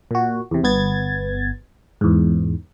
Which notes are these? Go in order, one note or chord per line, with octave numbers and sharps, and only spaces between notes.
A#2 F#4
E2 C3
G1 B3 G#6 A6
E2 G#2